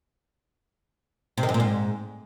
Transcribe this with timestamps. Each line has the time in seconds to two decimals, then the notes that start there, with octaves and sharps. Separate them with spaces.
1.37 C3
1.43 D#3
1.49 F#2
1.54 A#2
1.60 G#2